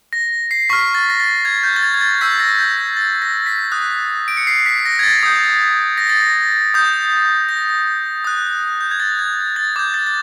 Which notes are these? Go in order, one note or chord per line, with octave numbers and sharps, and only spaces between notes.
A#6
C7
C#6 F6 B6
A6
A#6
A6
G#6
G6
A6
G#6
G#6
A6
C#6 E6 G6 B6
A#6
G6
A6
A#6
B6
D#6 F#6
D7
C#7
C7
B6
A#6
G#6
A6
D#6 G6
A#6
A6
A#6
D#6 G6
A#6
D#6 F#6
G6
G#6
A6
G#6
A6
D6 G6 G#6
A6
A6